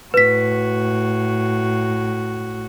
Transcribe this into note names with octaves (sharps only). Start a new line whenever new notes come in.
A2 F#4 B4 B6